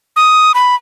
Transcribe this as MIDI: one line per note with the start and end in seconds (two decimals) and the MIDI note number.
0.16 0.52 87
0.54 0.75 83